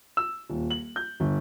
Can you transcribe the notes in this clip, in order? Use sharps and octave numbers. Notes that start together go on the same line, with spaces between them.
E6
D#1
F#7
G6
G1